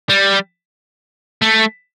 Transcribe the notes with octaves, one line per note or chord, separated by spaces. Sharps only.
G3
A3